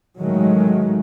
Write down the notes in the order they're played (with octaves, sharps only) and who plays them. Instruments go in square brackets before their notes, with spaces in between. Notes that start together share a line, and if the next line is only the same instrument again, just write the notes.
[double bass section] A1 D#3 F#3 G#3 A3